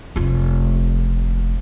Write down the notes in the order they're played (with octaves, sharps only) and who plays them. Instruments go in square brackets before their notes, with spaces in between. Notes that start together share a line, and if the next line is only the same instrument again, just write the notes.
[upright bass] F1 F4